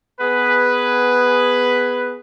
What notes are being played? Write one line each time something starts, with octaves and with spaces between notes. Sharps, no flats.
B3 G#4 B4